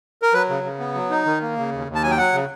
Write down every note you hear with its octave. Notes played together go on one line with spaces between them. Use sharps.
A#4
F#3 B4
C#3
C#3
B3
F#3
D#4
D#3
A#3
C#3
D#2
D#2
A5
F#3 G#5
G5
F#3 F#5
C#3